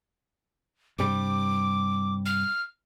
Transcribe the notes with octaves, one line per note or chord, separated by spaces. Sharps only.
G2 C3 G3 D6
F6